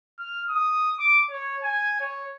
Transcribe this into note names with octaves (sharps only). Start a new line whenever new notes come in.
F6
D#6
D6
C#5
G#5
C#5